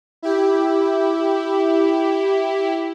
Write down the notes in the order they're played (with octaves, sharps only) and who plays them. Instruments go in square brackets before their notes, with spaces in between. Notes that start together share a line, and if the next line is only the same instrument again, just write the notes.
[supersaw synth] E4 G4